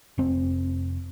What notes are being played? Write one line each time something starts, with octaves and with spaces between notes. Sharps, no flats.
F1 C4